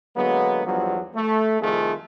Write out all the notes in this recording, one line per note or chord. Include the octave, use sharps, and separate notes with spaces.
D3 F#3 G#3 A#3 B3
E2 G2 F3 F#3
A3
C2 F2 D#3 A3 F4 G#4